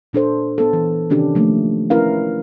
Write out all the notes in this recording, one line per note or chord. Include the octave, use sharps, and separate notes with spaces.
A#2 D4 A4 C5
B3 A4
E3
C3 D#3 C#4 D4 G4
F3 A3 A#3 D4
C#4 E4 A#4 B4 F5